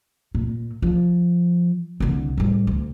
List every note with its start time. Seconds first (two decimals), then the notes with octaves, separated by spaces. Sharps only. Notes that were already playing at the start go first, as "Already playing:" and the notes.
0.35 A#2
0.82 F3
2.00 C2 D3
2.37 A2 G3
2.67 D2